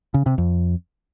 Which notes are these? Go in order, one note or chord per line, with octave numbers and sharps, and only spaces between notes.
C#3
C3
F2